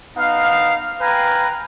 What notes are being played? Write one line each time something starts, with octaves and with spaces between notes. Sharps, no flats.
B3 D#4 F5
B4 F5 G5 G#5 A#5